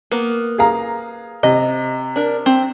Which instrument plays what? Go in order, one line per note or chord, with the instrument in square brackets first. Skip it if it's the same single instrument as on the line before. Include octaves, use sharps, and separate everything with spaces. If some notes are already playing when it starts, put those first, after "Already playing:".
[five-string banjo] A#3 B3
[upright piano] G#4 F5 A#5
[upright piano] C3 [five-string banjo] D#5
[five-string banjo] D4 A#4
C4